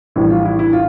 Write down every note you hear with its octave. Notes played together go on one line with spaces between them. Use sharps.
A#1 A2 E3 G3 E4
F4
E4
E4
F4